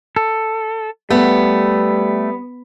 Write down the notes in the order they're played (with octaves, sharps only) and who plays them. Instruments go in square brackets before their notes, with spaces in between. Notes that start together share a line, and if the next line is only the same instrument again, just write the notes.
[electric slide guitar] A4
[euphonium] G3 [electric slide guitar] A3 [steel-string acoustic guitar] B3